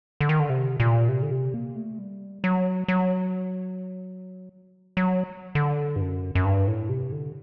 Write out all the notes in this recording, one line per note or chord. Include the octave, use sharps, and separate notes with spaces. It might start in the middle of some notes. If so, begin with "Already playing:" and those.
D3
D#3
D3
C3
A#2
C3
D3
C3
A#3
A3
G3
F#3
F#3
F#3
D3
G2
F#2
F#2
G2
A2
C3
D3